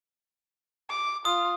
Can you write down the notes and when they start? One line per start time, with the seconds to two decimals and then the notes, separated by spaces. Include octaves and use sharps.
0.89 D6
1.25 F4 D#6